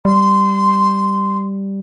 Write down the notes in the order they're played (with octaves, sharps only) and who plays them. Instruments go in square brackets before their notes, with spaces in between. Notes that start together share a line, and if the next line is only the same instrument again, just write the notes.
[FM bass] G3 [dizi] C6